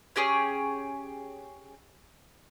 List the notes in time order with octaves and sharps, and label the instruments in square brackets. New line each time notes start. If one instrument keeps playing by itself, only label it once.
[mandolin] C#4 G4 G#4 C#5